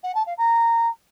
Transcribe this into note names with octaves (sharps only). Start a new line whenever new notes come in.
F#5
A5
F5
A#5